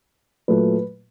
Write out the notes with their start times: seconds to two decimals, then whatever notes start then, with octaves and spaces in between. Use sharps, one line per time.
0.48 A#2 F#3 A3 B4